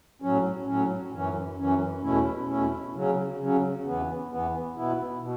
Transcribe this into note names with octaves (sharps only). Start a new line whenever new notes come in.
A2 F#3 C#4
A2 F#3 C#4
F#2 E3 C#4
F#2 E3 C#4
E2 B2 A3 C#4 E4
E2 B2 A3 C#4 E4
C#3 F#3 C#4
C#3 F#3 C#4
E2 E3 B3
E2 E3 B3
B2 B3 E4
B2